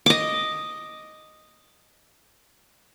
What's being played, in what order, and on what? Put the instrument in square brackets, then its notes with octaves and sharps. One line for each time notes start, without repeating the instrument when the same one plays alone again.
[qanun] D#5 D6